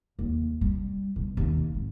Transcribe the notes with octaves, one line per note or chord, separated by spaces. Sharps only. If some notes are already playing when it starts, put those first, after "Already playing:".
D#2
G3
B2
D#2
G#1